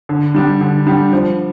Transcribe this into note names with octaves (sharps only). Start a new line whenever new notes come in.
D3
G3 D4 G4
D3
G3 D4 G4
F3